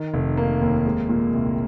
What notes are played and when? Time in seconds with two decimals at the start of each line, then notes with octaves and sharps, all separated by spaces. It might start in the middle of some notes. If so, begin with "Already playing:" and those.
Already playing: D#3
0.14 F1
0.37 A#3
0.61 D#2
0.85 G#3
1.09 A#2
1.33 C2